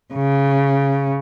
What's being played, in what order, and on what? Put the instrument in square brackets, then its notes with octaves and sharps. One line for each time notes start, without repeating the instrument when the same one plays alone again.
[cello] C#3